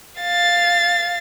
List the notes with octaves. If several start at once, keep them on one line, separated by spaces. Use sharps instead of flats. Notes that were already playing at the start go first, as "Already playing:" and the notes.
F5 A6